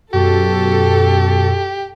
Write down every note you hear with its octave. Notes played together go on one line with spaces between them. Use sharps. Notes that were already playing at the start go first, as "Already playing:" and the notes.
F#2 B2 F#4 G4 A4